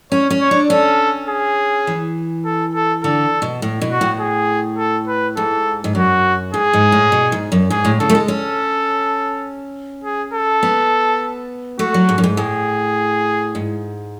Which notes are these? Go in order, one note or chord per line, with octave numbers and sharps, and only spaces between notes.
C#4 C#5
C#4
C#5
D4
C#4 A4
G#4
E3
A4
A4
D3 A4
B2
A2
B2
F#4
A2
G#4
A4
B4
G#2 A4
G#2
F#2 F#4
G#2 G#4
G#2
A2
B2
G#2
F#2
G#2 G#4
A2
C#3 A4
A3
G#3
C#4 A4
G#4
A4
B3
A3 F#4
F#3
G#2
F#2
G#2
A2 G#4
G#2